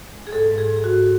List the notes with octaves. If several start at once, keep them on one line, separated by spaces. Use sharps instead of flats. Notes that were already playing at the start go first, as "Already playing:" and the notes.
G#3
G#4
G#2 A4
G#2
G#4
G#2
G#4
F#4
G#2